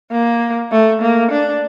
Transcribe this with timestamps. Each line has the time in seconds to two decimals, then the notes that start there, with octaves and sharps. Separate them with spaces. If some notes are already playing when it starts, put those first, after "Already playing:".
0.12 A#3
0.71 A3
1.02 A#3
1.32 D4